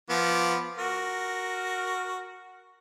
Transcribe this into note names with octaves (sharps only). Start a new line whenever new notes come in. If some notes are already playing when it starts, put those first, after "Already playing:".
F3 B3 D6
F#4 A#4